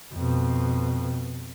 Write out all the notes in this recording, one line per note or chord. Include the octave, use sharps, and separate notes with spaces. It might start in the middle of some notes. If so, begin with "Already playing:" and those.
F2 B2